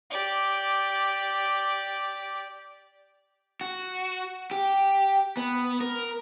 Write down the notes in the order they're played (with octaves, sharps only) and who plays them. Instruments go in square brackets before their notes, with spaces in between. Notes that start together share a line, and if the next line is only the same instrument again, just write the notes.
[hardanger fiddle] G4 D5
[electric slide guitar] F#4
G4
B3
A#4